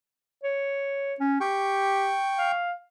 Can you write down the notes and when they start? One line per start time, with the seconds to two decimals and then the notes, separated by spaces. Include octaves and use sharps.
0.43 C#5
1.20 C#4
1.41 G4 G5 C#6
2.38 F5